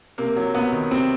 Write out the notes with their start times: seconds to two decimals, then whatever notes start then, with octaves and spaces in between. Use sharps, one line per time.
0.18 C3 A#3
0.36 F#3
0.55 C3 B3
0.73 D#3
0.91 C3 C4